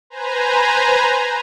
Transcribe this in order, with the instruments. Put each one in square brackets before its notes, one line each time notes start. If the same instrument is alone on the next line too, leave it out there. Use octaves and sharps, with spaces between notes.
[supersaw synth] B4 C5 G#5 A#5